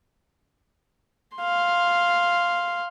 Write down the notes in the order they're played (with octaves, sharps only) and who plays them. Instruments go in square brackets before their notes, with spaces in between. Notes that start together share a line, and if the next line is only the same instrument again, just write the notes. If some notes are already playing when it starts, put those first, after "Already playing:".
[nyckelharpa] F5 C6